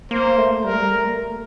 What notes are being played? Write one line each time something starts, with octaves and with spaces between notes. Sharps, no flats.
A#3 C5
A3
G3 A#4
A3
G3
A3
A#3
A3